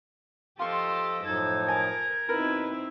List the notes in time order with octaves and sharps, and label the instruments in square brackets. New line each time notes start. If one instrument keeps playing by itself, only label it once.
[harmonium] F3 [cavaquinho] F4 C#6 [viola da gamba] G4 A4 D#5 [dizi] C6
[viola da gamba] F#2 A4 [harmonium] A2 F3 D#4 [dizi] G#6
[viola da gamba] A#4 [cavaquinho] G#5 A5
[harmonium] B2 [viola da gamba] C4 D#4 E4 [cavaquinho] A#4 B4